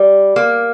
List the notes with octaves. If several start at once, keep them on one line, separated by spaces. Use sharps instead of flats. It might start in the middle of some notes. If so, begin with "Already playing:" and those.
Already playing: G3
A#3